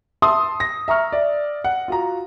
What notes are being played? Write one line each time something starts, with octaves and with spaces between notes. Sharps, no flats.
E5 A5 C6 D#6 E6
A#6
E5 A#5 C#6 F6
D5 E5
F#5
F4 F#4 A#5